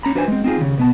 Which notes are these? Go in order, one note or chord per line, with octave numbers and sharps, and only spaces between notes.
C#4 A#5 B5
D4 F#4 B4 C5 E5 G#5
G#3 C4
C4 D#4 F4 G#4
D#2 C#3
B2 B3 A5